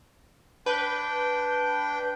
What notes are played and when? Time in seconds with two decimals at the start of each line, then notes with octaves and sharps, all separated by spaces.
0.66 D4 B4 G5 G6